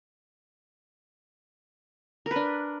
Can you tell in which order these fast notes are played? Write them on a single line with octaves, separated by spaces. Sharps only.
A#4 B4 D4